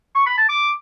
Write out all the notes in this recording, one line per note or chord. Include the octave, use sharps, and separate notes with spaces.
C#6
B5
A5
D6